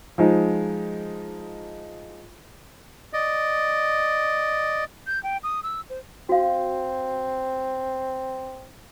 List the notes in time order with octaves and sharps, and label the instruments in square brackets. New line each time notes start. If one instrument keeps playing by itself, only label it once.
[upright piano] F3 G#3 D#4
[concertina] D5 D#5
[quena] G6
G5
D#6
E6
C5
[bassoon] C4 [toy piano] F#4 F5